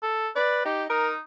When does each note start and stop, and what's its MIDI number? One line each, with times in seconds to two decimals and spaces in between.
0.03 0.29 69
0.36 0.63 71
0.36 0.63 74
0.65 0.89 63
0.65 0.84 67
0.90 1.20 63
0.90 1.11 70